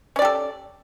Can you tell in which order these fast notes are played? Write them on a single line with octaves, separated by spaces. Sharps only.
C#4 D5 G4 A4